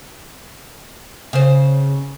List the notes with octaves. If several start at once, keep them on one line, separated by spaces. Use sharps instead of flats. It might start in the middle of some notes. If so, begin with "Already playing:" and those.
C#3 C5